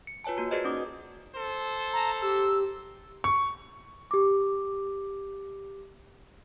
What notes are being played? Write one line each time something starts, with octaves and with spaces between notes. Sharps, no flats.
C#7
F4 B4 C#5 G#5 A5
A#3 F#4 A#5
F#4 G#4 B4 C5 D5 D#5
C#4 D#4 D6 D#6
A4 C5
A5 A#5
G4 E6
C#6
G4 D6